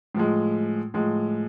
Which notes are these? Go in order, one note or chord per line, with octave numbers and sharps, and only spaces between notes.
A2 F3 G#3
A2 F3 G#3